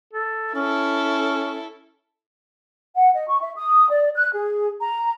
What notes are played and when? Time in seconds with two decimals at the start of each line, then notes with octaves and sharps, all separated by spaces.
0.13 A4
0.55 C#4 E4 A4
2.95 F#5
3.14 D#5
3.29 C#6
3.41 E5
3.57 D#6
3.89 D5
4.15 F#6
4.35 G#4
4.80 A#5